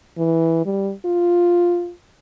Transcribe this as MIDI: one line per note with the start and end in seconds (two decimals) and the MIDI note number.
0.18 0.65 52
0.65 0.92 55
1.05 1.91 65